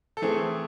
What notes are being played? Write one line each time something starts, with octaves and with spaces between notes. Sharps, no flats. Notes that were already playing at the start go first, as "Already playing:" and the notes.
A4
E3 A3 C4 G#4